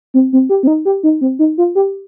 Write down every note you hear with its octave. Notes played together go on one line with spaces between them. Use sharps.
C4
C4
G4
C4
D#4
G4
D#4
C4
D#4
F4
G4